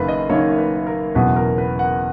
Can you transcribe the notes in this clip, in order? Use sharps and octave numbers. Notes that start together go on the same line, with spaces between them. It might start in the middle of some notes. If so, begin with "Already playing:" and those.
Already playing: F#1 F#2 D#3 A#3 B4
D#5
F#1 F#2 D#3 A#3 C#5
B4
A#4
F#1 E2 B2 F#3 B4
A#4
B4
F#5